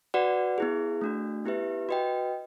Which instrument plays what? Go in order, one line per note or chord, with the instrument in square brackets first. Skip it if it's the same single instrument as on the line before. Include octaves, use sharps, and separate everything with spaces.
[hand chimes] F#4 B4 D5 F#5
B3 E4 G#4
A3 D4 F#4
B3 E4 G4 B4 E5
F#4 B4 D#5 G5